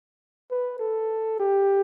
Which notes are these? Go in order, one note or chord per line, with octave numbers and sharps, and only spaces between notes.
B4
A4
G4